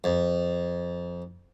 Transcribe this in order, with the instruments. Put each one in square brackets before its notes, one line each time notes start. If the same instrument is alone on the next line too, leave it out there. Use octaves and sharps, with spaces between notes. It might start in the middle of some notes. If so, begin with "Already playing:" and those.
[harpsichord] F2